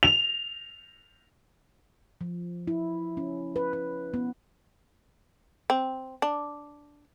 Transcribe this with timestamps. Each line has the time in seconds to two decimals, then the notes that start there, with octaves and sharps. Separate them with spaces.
0.03 F7
2.21 F3
2.67 E4
3.17 C#4
3.56 B4
3.73 B4
4.14 B3
5.70 C4
6.22 D4